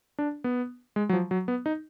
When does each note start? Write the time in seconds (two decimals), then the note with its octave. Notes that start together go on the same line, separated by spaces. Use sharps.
0.18 D4
0.44 B3
0.96 G#3
1.09 F#3
1.13 F3
1.31 F#3
1.48 B3
1.66 D#4